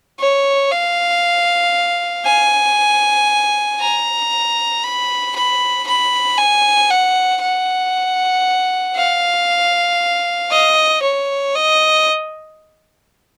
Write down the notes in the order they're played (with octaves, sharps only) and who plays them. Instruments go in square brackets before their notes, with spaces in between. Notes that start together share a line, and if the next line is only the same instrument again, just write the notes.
[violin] C#5
F5
G#5
A#5
B5
B5
B5
G#5
F#5
F#5
F5
D#5
C#5
D#5